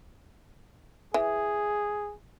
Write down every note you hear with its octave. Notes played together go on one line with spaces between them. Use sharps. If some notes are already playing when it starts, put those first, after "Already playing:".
E3 G#4